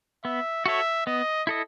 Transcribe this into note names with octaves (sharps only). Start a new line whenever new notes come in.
B3 E5
F#4 A4 C#5 E5
B3 D#5
E4 A4 D#5